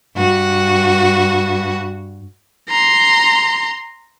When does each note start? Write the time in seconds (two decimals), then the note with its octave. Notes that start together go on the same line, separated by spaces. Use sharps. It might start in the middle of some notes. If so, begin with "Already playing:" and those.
0.15 G2 F#4
2.69 A#5 C6